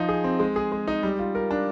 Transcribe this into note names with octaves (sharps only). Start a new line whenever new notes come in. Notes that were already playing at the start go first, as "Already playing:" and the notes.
Already playing: F3 D#4
G#4
C4
G#3
G#4
G#3
D#4
G3
F4
A#4
D4